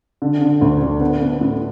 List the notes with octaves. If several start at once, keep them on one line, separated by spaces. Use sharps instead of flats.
D3
D3
D2
D3
B3
B3
A2